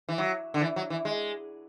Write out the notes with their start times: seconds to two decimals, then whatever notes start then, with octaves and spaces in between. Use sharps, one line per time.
0.09 E3
0.18 F#3
0.54 D3
0.62 E3
0.76 F#3
0.90 E3
1.05 G#3